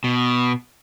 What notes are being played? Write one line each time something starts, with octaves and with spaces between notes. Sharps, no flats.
B2